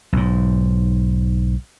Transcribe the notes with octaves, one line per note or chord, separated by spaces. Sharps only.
B1 G#2